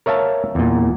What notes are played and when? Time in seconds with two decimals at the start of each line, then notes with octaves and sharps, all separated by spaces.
0.06 A#4 C#5 E5 F5 A5
0.55 E2 A#2